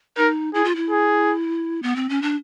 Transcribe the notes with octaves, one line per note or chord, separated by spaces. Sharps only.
D#4 A#4
E4 G#4
F4
E4
G#4
B3
C4
C#4
D4